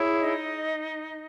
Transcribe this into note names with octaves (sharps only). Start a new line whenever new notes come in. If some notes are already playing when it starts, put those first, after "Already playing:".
Already playing: E4 G#4 C#5
D#4 D#5